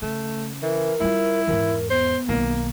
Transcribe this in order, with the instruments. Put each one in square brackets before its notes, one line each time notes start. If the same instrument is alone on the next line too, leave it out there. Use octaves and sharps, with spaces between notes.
[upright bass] C#3 [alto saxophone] A3
[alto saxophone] E3 [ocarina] A#4
[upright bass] G3 F4 [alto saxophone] E4
[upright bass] E2 G#2 [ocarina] A#4
[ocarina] B3 [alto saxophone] C5
[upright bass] B1 D#3 [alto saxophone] A#3